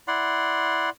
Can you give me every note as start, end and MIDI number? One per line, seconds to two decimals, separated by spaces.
0.08 0.90 64
0.08 0.90 74
0.08 0.90 78
0.08 0.90 84